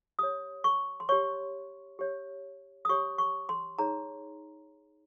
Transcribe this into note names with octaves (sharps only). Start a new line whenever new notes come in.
G4 C#5 D#6
C#6
C6
G4 C#5 C#6
G4 C#5
D#6
G4 C#5 C#6
C#6
C6
D#4 G#4 C#5 A#5